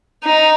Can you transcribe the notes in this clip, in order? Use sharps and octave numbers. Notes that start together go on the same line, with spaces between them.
D#4